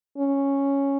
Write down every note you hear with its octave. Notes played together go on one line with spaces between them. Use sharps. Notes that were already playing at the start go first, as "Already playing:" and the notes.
C#4